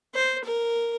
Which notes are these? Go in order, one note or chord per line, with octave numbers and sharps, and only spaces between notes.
C5
A#4